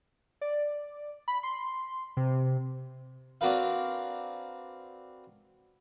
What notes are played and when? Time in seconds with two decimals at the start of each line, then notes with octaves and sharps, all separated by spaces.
0.41 D5
1.28 B5
1.43 C6
2.17 C3
3.41 C4 D4 F#4 A#4 B4 F5